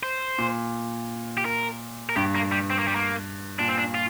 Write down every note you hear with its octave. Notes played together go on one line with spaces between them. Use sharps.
C5
A#2
G4
A#4
A#4
G2 G4
A#3
G3
C4
A#3
G3
A#3
A#2 D4
C4
D4
F4